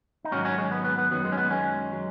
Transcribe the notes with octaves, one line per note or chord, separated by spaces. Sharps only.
D#4
G#2 D#3 F#3 C#4 F#4
C#4 F#4
G#3 C#4
B3
B3
B3
F#2 D#3 F#3 B3
G#3
C#4
B3
G#3 C#4
F#3